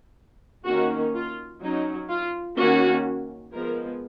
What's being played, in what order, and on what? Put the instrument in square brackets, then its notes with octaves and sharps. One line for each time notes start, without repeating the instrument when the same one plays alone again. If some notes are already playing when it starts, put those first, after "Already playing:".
[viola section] D#3 A#3 C#4 F#4
F4
F#3 C#4 D#4
F4
D#3 A#3 C#4 F#4
F3 G#3 B3 A#4